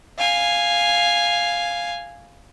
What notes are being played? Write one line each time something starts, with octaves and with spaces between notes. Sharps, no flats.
F5 G#5